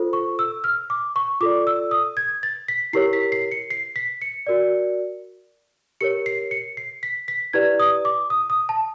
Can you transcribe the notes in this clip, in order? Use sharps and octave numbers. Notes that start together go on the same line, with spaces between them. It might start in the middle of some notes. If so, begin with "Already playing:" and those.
Already playing: F4 A4 C5
C#6
E6
F6
D6
C#6
F4 A4 D5 D6
E6
D#6
G#6
A6
B6
E4 G4 A#4 C#5 C7
B6
C7
C#7
C7
B6
C#7
F#4 A#4 D5
G4 A#4 C#5 C#7
C7
C#7
C7
B6
B6
E4 G4 B4 D5 G#6
D#6
D6
D#6
D#6
A5